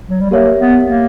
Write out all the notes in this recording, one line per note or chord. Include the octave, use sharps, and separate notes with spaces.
F#3
G3
A#3 G4 A#4 C#5 E5
B3
A#3